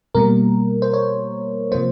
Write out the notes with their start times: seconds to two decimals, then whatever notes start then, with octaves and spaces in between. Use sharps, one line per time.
0.15 B2 G3 A#3 A#4
0.82 C5
0.93 C#5
1.72 C3 F3 A#3 C5